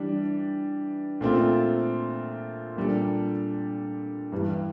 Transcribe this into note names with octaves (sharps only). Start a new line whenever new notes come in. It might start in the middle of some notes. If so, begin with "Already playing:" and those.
Already playing: E3 G3 D4
A#2 A3 C4 F4
A#2 G3 D4 A4
G2 E3 G3